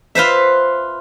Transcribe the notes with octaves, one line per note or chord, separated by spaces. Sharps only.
F4 B4 C5 E5